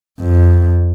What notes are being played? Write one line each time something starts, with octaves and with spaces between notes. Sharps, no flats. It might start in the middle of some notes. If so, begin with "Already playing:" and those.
F2